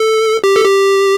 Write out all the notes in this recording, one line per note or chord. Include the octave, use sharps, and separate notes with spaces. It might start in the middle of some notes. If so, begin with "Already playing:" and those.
Already playing: A4
G4
A4
G4